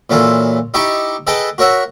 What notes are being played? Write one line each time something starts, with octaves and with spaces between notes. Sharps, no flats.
A#2 E3 F#3 F4 A4
D#4 E4 G4 G5 A5 C#6
G#4 A4 B4 D#5 G5 A5
F#4 A#4 C#5 E5 F#5